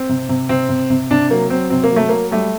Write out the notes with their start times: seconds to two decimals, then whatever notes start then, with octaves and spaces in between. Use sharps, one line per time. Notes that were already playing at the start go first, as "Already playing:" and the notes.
Already playing: C4
0.09 C3
0.29 C3
0.49 C3 C4
0.69 C3
0.90 C3
1.11 C3 D4
1.30 F#3 A#3
1.50 F#3 C4
1.70 C3 C4
1.84 A#3
1.91 F#3
1.96 A3
2.09 F#3 A#3
2.31 G3 A3